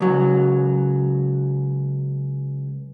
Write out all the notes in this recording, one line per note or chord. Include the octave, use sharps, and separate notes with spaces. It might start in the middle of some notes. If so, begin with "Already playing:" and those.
C#2 F#3